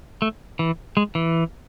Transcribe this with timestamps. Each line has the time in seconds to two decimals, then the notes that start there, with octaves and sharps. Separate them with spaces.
0.22 A3
0.59 E3
0.97 G#3
1.15 E3